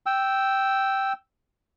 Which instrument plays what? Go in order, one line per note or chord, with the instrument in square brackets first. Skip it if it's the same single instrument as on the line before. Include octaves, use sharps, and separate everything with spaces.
[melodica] G5 E6